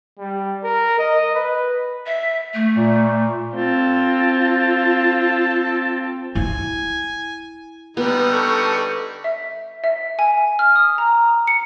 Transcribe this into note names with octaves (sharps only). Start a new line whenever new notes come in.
G3
A#4
D#5
B4
E5
A3
A#2
C4 F4 A4
E4 G#5
D3 G3 B3 D#4
A4 C#6
E5
E5
G#5
F6
D#6
A#5
C#7